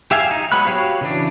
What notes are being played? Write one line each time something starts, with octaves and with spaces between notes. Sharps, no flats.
G4 E5 F5 G#5
D#4
F#3 G#3 B3 B5 F#6
F#4 G4 C#5 F5
C#3 E3 D4